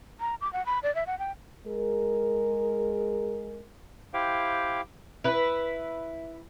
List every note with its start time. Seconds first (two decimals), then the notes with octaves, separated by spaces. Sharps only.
0.20 A#5
0.41 D6
0.53 F#5
0.66 B5
0.83 D5
0.95 E5
1.07 F#5
1.19 G5
1.66 G#3 G#4 A#4
4.14 E4 G4 C5 F5 G5
5.24 E4 B4